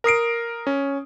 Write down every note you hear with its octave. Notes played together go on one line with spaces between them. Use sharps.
A#4 D#6 C7 D7
C#4